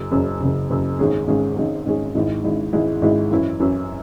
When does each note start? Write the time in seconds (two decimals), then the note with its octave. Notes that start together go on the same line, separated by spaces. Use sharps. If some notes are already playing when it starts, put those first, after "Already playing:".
Already playing: F#1 F#2 C#3
0.11 F#1 F#2 C#3
0.40 F#1 F#2 C#3
0.70 F#1 F#2 C#3
0.99 G#1 G#2 G#3 C#4 G#4
1.27 G#1 G#2 G#3 C#4 G#4
1.57 G#1 G#2 G#3 C#4 G#4
1.86 G#1 G#2 G#3 C#4 G#4
2.15 G#1 G#2 G#3 E4
2.44 G#1 G#2 G#3 E4
2.73 G#1 G#2 G#3 E4
3.02 G#1 G#2 G#3 E4
3.31 F#2 E3 C#4 E4
3.60 F#2 E3 C#4 E4